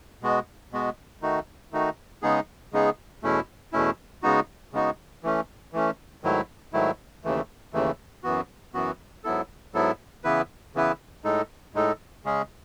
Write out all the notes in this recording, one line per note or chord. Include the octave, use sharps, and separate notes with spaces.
B2 G#3 B3 F#4
B2 G#3 B3 F#4
D#3 A3 D#4 F#4
D#3 A3 D#4 F#4
C#3 G#3 B3 D#4 G#4
C#3 G#3 B3 D#4 G#4
E2 B2 A3 C#4 E4
E2 B2 A3 C#4 E4
C#3 G#3 B3 D#4 F#4
C#3 G#3 B3 D#4 F#4
E3 A3 C#4
E3 A3 C#4
G#2 D#3 F#3 A3 E4
G#2 D#3 F#3 A3 E4
D#2 C#3 E3 A3
D#2 C#3 E3 A3
F#2 E3 B3 F#4
F#2 E3 B3 F#4
G#2 F#3 B3 E4 A4
G#2 F#3 B3 E4 A4
C#3 E3 B3 E4 B4
C#3 E3 B3 E4 B4
A2 G#3 D#4 A4
A2 G#3 D#4 A4
C#3 G#3 C#4 G#4